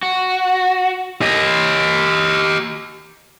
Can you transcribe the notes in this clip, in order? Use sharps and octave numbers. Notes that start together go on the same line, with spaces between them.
F#4
G4 D#5